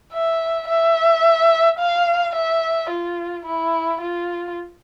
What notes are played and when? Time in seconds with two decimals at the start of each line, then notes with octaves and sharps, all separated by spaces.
0.13 E5
0.69 E5
1.79 F5
2.35 E5
2.90 F4
3.45 E4
4.01 F4